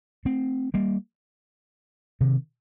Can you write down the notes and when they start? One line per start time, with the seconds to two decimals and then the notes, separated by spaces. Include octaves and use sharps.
0.25 A3 C4
0.74 G3 A#3
2.20 C3 D#3